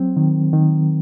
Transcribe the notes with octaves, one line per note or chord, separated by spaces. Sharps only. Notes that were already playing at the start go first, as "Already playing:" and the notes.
Already playing: F#3 C4
D#3
D#3